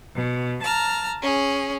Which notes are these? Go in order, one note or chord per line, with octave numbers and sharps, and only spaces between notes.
B2
A5 A#5 F6
C#4 G#4